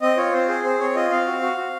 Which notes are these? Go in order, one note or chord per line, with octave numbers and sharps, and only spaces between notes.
C4 D#5
F4 C#5
C4 C5
G#4 C5
C4 C5
C4 C#5
F4 D#5
C4 F5
F#4
F#4
F#4